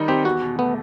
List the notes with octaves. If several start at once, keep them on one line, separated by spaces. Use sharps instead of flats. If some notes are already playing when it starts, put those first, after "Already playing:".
Already playing: D#3 G3 D#4
C4 G4
E2 F#4
B2
A3 B3